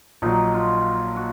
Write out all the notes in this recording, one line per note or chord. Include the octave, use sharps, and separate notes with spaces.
A#1 A#2 F#3 D#4
F4
F#4